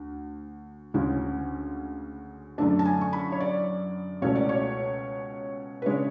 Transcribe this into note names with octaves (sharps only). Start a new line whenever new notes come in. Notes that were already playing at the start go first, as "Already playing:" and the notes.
Already playing: D2
D2 C#3 G#3 C#4
F#2 D3 A3 D4 A5
A5
G#5
C#6
B5
C#5
D5
C#2 B2 A3 C#4 C#5
D5
C#5
B4
C#3 G#3 D4 C#5